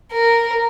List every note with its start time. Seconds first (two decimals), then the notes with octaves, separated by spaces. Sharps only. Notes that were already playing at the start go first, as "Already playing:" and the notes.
0.13 A#4